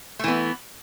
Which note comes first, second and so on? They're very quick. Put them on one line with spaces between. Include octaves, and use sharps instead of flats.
A3 E3 B3